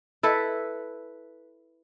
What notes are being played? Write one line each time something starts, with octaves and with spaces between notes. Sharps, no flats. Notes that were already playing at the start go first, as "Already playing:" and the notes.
E4 A4 B4